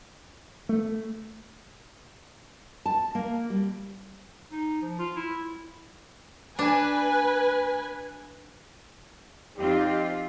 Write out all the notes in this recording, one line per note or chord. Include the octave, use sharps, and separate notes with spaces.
A3
A5
A#3
G3
D#4
F3
F4
E4
D4 B4 G#5
F2 C4 D#4 F4 G4